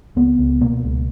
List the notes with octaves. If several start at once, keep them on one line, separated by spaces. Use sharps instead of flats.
C#2 B3
C#2
B2 A#3
C#2